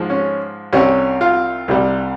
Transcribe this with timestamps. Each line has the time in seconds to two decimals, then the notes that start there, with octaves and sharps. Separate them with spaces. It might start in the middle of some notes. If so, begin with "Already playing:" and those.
Already playing: G#2 F3 G#3
0.10 C#4
0.73 C2 C3 G3 C#4
1.21 F4
1.68 C2 C3 G3